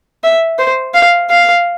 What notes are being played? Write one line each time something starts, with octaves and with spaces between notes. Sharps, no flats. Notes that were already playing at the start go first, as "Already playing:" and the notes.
E5
C5
F5
F5